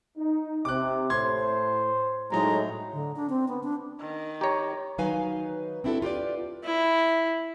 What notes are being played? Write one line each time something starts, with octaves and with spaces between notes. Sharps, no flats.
D#4
C3 D6 F#6
A2 C5 C6 G#6
A2 F#3 G#3 D#4 A#5
D3
D4
C4
B3
D4
D#3
G4 C#5 A#5
D#3 F#3 D#4 B4 F5 G#5
C4 D4 E4 F#4 A4
F4 G4 B4 D5
E4